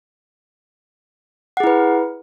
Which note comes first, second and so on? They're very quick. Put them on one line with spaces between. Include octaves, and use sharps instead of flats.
F#5 G#4 E4 B4